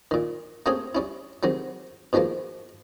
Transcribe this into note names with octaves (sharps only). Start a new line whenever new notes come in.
A#2 D#3
A3 A#3 C4 C#4 G4 G#4
G3 C#4 E4
C3 D#3 F#3 G#3
B2 D#3 F3 G#3 A#3